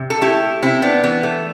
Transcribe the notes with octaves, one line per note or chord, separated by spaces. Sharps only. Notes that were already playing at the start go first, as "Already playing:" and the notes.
Already playing: C3
A4
A3 E4 G4
C3 C4 E4
B3 D4
E3 B3
A3